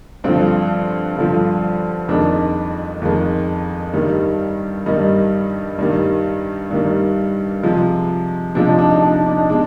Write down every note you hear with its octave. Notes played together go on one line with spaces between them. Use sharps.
G2 D3 F3 C4
G2 D3 F3
F2 D#3 G#3 D4
F2 D#3 G#3
G2 D#3 G3
G2 D#3 G3 D#4
G2 D#3 G3
G2 D#3 G3
C3 F3 G#3
C3 F3 G#3 D4
D#4
D4
D#4
D4
D#4
D4
D#4
B2 G#3 D4